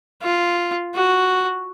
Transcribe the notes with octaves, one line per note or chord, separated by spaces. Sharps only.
F4
F#4